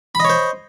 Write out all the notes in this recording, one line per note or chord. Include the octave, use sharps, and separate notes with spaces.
C5 C#5 D#5 B5